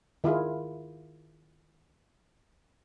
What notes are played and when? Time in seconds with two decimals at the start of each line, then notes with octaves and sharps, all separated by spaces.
0.24 D#3 E4 F4 G#4